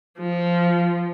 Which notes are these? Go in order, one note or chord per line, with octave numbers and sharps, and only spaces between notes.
F3